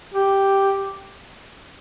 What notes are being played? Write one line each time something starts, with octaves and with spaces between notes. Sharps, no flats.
G4